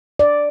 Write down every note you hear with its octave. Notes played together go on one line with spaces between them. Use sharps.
D5